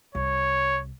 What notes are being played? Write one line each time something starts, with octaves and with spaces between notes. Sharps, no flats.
C2 C#5